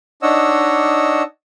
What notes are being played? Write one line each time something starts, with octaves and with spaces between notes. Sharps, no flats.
D4 D#4 C#5 D#5 F#5 E6